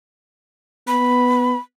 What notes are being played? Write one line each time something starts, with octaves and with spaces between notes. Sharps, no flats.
B3 B5